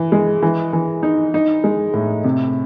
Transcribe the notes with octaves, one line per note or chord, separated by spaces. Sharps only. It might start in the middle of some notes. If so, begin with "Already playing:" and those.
Already playing: E3
G#3
E3
E3
D#4
D#4
G#3
A2
C3